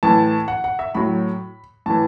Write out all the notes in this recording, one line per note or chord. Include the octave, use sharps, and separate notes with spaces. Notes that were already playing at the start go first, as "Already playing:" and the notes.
A2 E3 A5
F#5
F#5
E5
A2 F#3 B5
A2 E3 A5